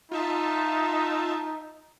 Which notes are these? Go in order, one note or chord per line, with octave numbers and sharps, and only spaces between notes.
D#4 F4 E5 A5